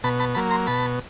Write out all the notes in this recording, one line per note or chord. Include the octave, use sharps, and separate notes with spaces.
B2 A5 B5
A5 B5
F#3 A#3 A5 B5
A#5 C6
B2 A5 B5